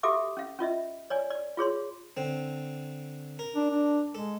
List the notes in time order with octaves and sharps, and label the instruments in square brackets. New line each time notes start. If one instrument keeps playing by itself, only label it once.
[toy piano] F#4 G4 A4 E5 F5 D6
C#4 F5
C#4 F4 D#5 E5
C#5 D5 G#5
D5
F4 G#4 C#5 C6
[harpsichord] D3 C4
A#4
[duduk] D4
D4
[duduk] G#3 [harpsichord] A4